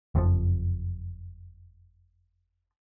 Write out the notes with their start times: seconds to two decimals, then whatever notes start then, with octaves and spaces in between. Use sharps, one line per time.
0.15 F#1 F2 F3